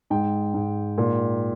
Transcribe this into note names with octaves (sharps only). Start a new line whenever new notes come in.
G#2 G5
G#2
A#2